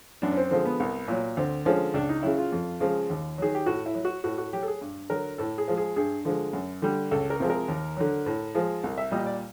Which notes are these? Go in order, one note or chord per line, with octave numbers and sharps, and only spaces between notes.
F#2 D4
C#4
C4
D3 F3 G#3 C4
B3
C2
A#2 F#3
D2 C4
D3 F3 G#3 C#4
C#2 D4
D#4
C#3 F#3 E4
F4
F2
C#3 F3 G#3
D#2
D#3 F#3 G#4
G4
A2 F#4
E4
F#3
F#4
A2 F#4
F#4
F#3 G4
A4
G#4
G2
D3 F#3 A#4
A2 A4
G#4
F3 G#3
G#4
G2 G#4
D3 F3 G#3
F#2
D3 G3
C#2 A4
A#4
C3 F3 G#3
A#4
D#2
D3 F#3
A2
F3 G#3
C2
E5
A#2 G3 D#5
D5